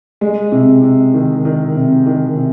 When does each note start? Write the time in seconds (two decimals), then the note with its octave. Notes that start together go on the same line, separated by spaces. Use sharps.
0.21 G#3
0.52 C3
0.83 C3
1.14 D#3
1.45 D#3
1.75 C3
2.06 D#3
2.37 C3